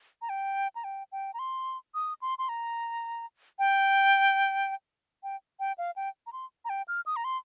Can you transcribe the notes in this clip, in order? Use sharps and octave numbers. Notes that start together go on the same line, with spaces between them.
A#5
G5
A#5
G5
G5
A#5
C6
D#6
C6
C6
A#5
G5
G5
G5
F5
G5
A#5
C6
A#5
G5
F6
D#6
A#5
C6